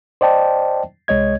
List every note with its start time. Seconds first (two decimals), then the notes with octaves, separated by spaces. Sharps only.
0.21 C5 D5 D#5 G5 A5
1.08 C2 G#3 C#5 D#5 G#6